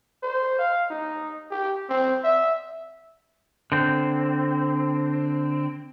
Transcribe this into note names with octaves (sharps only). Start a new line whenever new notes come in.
C5
F5
D#4
G4
C4
E5
D3 C4